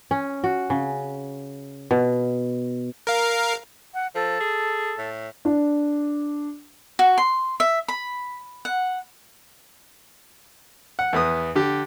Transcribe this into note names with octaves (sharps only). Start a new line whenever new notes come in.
C#4
F#4
C#3
B2
A#4 F5
F#5
F3 A4
G#4
A2
D4
F#4
C6
E5
B5
F#5
F#5
E2 B3 D#6
D3 G4